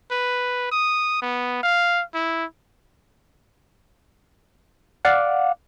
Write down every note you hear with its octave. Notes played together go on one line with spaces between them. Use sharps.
B4
D#6
B3
F5
E4
D5 F5 F#5